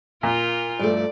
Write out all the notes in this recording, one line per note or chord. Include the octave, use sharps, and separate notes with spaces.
A#2 F4 A#4
G2 F3 A3 D5